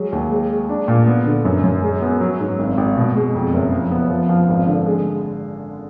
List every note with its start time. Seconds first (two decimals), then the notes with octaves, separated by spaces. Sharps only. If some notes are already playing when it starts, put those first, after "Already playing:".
Already playing: F#3 G#3
0.12 D#2
0.31 G#3
0.50 G#3
0.69 D4
0.88 A#2
1.07 B3
1.26 D3
1.45 F#2
1.64 F#2
1.83 G#3
2.02 B3
2.21 F#3
2.40 G#2
2.58 G#1
2.77 G#1
2.97 B2
3.16 G#3
3.35 F2
3.54 F#1
3.72 F3
3.91 B3
4.10 F3
4.29 F3
4.49 G#1
4.67 D3
4.86 G#3